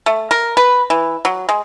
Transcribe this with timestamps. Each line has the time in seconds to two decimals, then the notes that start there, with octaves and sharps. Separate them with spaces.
0.06 A3
0.31 A#4
0.57 B4
0.90 E3
1.25 F#3
1.49 G#3